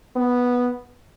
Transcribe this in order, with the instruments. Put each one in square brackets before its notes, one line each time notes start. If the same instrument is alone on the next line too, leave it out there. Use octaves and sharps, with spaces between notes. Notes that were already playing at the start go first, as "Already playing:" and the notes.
[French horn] B3